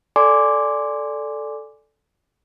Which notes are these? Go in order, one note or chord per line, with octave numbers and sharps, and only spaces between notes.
A4 D5 G#5 C6 D6